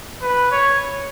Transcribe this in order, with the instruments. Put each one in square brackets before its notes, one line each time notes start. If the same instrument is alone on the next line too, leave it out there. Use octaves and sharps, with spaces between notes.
[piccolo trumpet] B4
C#5